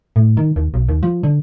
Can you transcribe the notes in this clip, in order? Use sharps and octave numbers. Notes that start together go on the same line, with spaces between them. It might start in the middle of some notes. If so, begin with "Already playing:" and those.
A2
D#3
D#2
B1
D#2
F3
D3